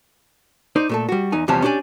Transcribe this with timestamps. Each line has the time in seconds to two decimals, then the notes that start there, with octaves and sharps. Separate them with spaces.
0.76 D#4 C5 D5
0.89 A#2 A3 A4
1.09 G3 F#4
1.32 E2 D#4 G#5
1.48 E2 C3 F3 G3 C#4 A5
1.62 C#4 D4 G4 B4 D5 G#5